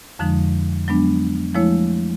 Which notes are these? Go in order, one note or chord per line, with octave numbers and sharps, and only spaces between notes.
F2 D3 F3 G#3 D#4
F#3 G#3 B3 D4
F3 G#3 A3 E4 C#5